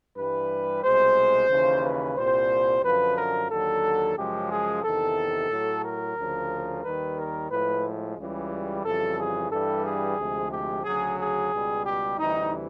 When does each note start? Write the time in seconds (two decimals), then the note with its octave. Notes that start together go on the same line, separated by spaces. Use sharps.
0.17 G2 E3 G3 B4
0.83 C2 B2 G#3 C5
1.50 D#2 C#3 E3
1.83 B4
2.17 C2 A#2 G3 C5
2.83 F#2 D3 F3 B4
3.17 A#4
3.50 D#2 D3 F#3 A4
4.17 F#2 C#3 F3 G#3 G4
4.51 G#4
4.84 E2 C3 D#3 A4
5.50 A2 F#3
5.84 A#4
6.17 D2 C#3 F3
6.84 D#2 D#3 G3 B4
7.17 A#4
7.50 A2 F3 G#3 B4
8.18 C#2 C#3 E3 G3
8.84 F2 C#3 E3 G3 A4
9.18 G#4
9.51 G2 E3 G3 A4
9.85 G#4
10.19 D2 C3 F3 G#3
10.51 G4
10.84 D2 C#3 F#3 G#4
11.18 G#4
11.52 C#2 B2 G3
11.86 G4
12.18 D2 C3 E3 G3 D#4